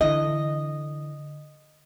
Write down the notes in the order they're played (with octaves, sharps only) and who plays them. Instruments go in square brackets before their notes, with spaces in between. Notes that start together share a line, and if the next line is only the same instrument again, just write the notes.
[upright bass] D3 E3 [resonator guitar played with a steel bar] D#5